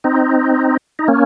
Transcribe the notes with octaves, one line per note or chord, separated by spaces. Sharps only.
C4 D#4
D#4
A#3 C#4